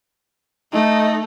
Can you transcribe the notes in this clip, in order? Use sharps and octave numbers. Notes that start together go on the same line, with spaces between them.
A3 D#4